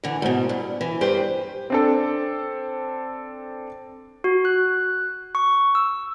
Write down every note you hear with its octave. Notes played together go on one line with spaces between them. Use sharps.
D3 E3
G#2 B2
G2
E3
G2 G4 B4 C5
C4 D4 A4
F#4
F#6
C#6
E6